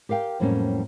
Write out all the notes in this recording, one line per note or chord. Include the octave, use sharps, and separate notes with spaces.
G4 A#4 F5 G5
F2 A2 F#3 G3 A#3 C#4